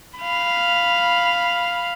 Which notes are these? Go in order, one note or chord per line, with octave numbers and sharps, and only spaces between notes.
F5 B5